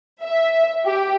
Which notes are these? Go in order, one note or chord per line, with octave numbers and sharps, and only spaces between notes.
E5
G4